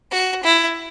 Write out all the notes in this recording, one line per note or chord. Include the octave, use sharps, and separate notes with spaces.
F#4
E4